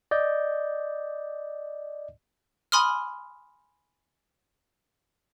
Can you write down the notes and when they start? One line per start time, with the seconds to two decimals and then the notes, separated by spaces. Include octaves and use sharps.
0.11 D5 D#5 G6
2.72 G#5 B5 C6 D#6 F6